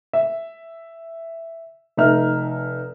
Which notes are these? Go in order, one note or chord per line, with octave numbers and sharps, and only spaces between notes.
E5
F1 D#4 E5 F6